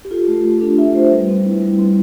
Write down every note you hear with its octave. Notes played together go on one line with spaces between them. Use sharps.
G4
F4 A4
A3 G4
A3 A4
D4 A4
F4 E5
A3 C5
G3 B4
C4
E4
G3
C4